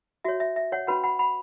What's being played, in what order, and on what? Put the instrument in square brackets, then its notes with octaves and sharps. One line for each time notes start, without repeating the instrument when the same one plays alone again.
[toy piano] F#4 C#5 E5
E5
E5
C#5 F#5
C#4 F#4 B4 F#5 B5
F#5 B5
F#5 B5